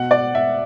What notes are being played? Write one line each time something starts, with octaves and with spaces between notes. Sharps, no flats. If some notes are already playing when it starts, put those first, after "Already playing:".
Already playing: B2 F#5
D5
E5